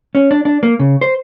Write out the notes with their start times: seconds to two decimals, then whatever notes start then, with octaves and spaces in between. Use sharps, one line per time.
0.15 C#4
0.31 D4
0.45 D4
0.63 A#3
0.79 C#3
1.01 C5